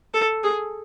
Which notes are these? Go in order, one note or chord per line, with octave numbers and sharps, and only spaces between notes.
A4
G#4